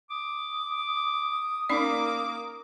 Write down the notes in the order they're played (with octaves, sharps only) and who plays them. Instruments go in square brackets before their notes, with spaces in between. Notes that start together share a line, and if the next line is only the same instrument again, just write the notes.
[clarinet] D6 [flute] D#6
[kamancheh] A#3 D6 [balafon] C#4 D#4 D5